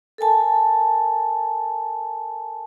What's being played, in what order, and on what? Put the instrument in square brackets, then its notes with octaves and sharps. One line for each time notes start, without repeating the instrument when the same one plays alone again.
[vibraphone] A4 A#4 G#5 A5